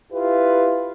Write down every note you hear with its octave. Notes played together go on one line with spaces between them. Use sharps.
E4 F4 G4 B4